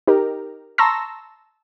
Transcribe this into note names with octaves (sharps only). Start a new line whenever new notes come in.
D#4 G4 A#4
A5 A#5 C6 C#6 E6 A#6